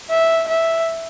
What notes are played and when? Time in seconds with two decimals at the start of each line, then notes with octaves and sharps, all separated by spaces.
0.10 E5
0.47 E5